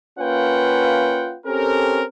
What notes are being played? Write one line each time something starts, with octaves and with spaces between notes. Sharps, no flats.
A#3 C#4 F4 B4 F#5 G5
C4 C#4 G4 A4 A#4